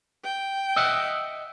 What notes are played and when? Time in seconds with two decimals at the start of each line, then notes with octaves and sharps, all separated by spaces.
0.24 G5
0.76 D#5 E5 F#5